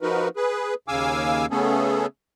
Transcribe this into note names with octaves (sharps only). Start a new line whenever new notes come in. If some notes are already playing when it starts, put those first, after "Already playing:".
F3 D#4 F#4 A#4 B4
G#4 B4
D#2 C#3 F5 G#5 D6 E6
C#3 A3 B3 C#4 G#4 A4